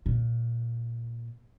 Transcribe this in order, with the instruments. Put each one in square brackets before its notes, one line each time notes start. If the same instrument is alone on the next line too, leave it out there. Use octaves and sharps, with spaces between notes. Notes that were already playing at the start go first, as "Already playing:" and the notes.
[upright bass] A#2